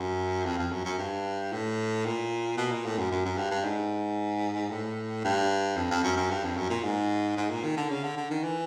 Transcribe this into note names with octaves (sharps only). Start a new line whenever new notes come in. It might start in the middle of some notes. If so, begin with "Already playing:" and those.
Already playing: F#2
F2
F2
F#2
F#2
G2
A2
A#2
B2
A#2
A2
F#2
F#2
F#2
G2
G2
G#2
A2
G2
F2
F2
F#2
F#2
G2
F2
F#2
A#2
G#2
G#2
A#2
D#3
D3
C#3
D3
D3
D#3
E3